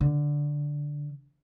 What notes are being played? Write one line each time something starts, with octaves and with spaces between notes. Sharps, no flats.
D3